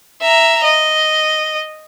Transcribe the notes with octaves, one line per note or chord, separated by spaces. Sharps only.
E5 A#5
D#5